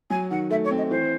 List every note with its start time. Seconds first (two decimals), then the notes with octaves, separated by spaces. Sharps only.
0.10 F#3 G#5
0.30 D#3 F#5
0.50 A3 E5
0.64 C#5
0.71 C4
0.78 D#5
0.90 E3 C5